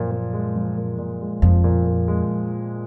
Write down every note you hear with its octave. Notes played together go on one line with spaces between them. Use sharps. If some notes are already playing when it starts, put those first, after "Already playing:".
Already playing: F#2 A#2 F3
A#2
G#3
F3
A#2
A#2
G#3
F2 F3
A#2
A#2
G#3